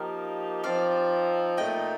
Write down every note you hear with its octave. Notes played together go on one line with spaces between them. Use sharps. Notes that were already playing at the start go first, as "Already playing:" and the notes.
Already playing: F3 A#3 D#4 G4 A#4
F3 C4 D#4 D5 F5
A#2 A3 D#4 D#5 G5